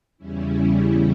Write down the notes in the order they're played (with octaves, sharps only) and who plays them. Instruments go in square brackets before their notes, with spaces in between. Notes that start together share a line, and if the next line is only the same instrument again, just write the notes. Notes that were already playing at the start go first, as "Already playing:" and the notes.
[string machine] E2 C#3 G3 C#4 E4